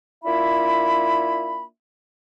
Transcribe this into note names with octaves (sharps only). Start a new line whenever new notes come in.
A#3 D4 E4 F4 E5 B5